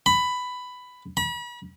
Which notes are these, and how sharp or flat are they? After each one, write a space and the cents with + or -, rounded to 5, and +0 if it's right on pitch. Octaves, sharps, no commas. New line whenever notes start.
B5 +10
B5 -40